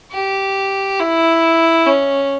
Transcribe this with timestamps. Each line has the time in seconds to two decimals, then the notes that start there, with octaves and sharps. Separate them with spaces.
0.12 G4
1.00 E4
1.87 C#4